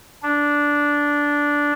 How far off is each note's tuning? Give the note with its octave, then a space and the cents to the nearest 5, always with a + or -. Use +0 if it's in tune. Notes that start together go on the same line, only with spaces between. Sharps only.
D4 -10